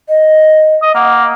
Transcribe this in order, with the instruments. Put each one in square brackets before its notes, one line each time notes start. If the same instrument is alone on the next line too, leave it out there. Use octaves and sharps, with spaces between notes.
[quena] D#5
[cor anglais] D#5
[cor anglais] A#3 [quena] F#5